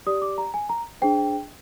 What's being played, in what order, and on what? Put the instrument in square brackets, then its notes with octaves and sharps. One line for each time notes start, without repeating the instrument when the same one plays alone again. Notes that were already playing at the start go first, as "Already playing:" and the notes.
[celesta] G4 D5 D#6
D6
A#5
G#5
A#5
D4 G#4 C5 G5